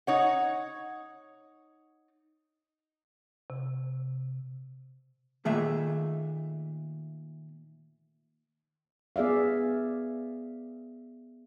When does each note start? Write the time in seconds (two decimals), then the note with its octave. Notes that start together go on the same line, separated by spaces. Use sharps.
0.07 D#4 C#5 F#5
3.50 C3
5.45 A#2 D#3 A3 G#4 E5
9.16 B3 G#4 D5 E5 F5